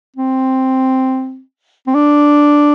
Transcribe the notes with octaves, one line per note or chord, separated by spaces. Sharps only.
C4
C4
D4